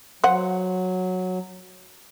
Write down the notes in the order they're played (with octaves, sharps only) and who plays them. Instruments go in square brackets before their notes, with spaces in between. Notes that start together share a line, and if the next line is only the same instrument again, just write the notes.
[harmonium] F#3 [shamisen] C5 F#5